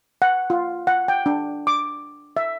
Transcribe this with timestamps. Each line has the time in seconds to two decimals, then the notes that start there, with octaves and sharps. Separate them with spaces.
0.22 F#5
0.50 F4
0.87 F#5
1.08 G5
1.26 D4
1.67 D6
2.37 E5